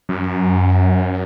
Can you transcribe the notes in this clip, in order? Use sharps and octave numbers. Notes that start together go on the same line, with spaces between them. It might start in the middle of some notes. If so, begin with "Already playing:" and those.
F#2